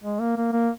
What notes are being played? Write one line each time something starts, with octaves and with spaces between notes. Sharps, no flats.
G#3
A#3
A#3
A#3